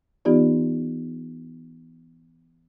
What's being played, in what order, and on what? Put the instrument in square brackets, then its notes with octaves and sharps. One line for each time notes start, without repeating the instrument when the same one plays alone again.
[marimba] E3 B3 D#4 F4 G4 D5